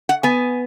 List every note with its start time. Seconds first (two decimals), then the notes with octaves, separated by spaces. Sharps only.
0.09 F#5
0.23 B3 G#5